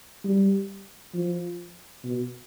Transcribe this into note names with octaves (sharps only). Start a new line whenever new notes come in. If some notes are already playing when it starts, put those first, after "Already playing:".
G3
F3
B2